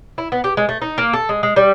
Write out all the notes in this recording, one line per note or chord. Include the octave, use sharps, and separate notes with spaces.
E4
B3
G4
G#3
A3
D#4
A#3
A4
G#3
G#3
G3